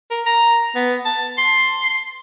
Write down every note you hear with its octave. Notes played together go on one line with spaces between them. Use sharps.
A#4
A#5
B3
A5
C6